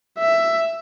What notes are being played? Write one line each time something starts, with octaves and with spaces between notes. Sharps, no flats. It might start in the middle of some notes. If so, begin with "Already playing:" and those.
E5